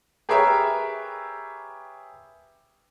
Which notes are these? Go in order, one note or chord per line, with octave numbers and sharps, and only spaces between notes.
G4 G#4 A#4 B4 C#5 E5